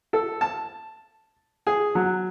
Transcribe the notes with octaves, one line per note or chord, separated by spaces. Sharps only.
A4
A5
G#4
F#3